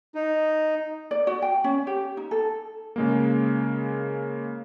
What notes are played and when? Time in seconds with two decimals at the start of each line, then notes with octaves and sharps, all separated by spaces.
0.15 D#4
1.11 D5
1.27 F#4
1.42 G5
1.64 C#4
1.87 G4
2.17 D#4
2.31 A4
2.96 C#3 G#3 A#3